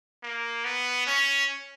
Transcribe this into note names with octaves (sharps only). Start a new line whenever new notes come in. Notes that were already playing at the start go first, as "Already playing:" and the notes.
A#3
B3
C#4